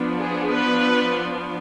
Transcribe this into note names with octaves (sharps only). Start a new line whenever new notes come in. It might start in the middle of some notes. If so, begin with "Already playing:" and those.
Already playing: F3 B3 D4
G#4
B4